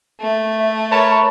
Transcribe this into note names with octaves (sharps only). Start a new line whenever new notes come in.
A3
E5
A#4 B4 C#5 A5 B5